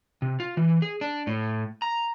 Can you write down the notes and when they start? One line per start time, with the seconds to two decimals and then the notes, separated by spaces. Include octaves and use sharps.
0.22 C3
0.40 F4
0.57 E3
0.82 G#4
1.01 D4
1.27 A2
1.82 A#5